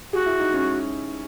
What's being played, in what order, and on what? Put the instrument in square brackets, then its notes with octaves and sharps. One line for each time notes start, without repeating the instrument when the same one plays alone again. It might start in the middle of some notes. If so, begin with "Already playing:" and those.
[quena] F#4 [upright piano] G#4
[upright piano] E4
D#4
C#4